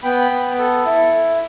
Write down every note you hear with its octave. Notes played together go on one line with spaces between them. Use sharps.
B3 G5 B5
B3
A4
E4